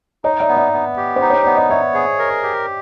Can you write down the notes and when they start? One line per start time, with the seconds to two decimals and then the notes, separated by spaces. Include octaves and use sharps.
0.24 D#4 C#5 D#5
0.40 D5 E5
0.49 B3
0.56 D5 E5
0.73 B3
0.97 G4
1.16 C5
1.22 D#4
1.30 C#5
1.43 B3 D5
1.57 D#5
1.70 C#5 D5 E5
1.94 G#4
2.19 A#4
2.43 G4